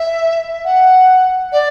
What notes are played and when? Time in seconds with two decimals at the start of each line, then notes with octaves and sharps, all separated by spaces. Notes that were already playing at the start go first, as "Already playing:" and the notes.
Already playing: E5
0.64 F#5
1.52 D5